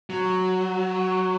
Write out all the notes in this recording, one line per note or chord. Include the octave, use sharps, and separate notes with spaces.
F#3